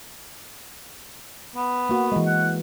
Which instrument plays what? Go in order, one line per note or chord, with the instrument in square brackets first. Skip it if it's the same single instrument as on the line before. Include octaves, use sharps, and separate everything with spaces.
[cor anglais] B3
[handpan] A#3 F#4
E3 G#3
[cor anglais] F#5